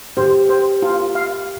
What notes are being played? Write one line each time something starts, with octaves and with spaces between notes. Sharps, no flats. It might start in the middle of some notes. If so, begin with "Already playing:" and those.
G4 C5
C5
F4
F5